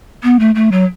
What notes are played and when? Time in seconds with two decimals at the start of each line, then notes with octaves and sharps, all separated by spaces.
0.23 B3
0.39 A3
0.55 A3
0.72 F#3